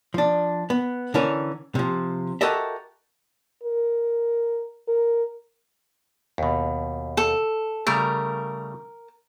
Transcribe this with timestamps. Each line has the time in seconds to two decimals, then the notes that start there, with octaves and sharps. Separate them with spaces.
0.14 F3 D4
0.70 B3
1.14 D3 E3 C#4 A#4
1.75 C3 F3
2.41 F#4 G4 A4 A#4 D#5 E5
3.63 A#4
4.88 A#4
6.38 D#2 B2
7.17 A4
7.87 C#3 G3 A3 A#4